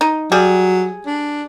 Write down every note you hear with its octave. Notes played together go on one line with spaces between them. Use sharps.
D#4
F#3 G3 G#4
D4